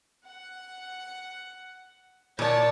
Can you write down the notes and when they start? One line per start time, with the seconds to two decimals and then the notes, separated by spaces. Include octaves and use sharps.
0.25 F#5
2.39 A#2 C#5 D5 A5